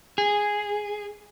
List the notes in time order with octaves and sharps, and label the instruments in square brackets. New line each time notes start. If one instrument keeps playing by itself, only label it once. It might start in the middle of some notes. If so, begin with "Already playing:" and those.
[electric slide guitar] G#4